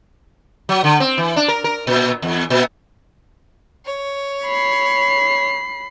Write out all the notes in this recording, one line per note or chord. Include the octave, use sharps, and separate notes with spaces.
F#3
D3
C4
E3
D4
A#4
A#4
A#2
E2
A#2
C#5
B5 C7